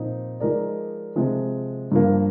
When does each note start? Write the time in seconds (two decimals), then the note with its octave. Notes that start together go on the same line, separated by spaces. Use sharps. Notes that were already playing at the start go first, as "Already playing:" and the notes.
Already playing: A#2 F3 C4 D#4
0.40 F3 G#3 D#4 A#4 D5
1.16 C3 F3 G#3
1.92 G2 F3 A#3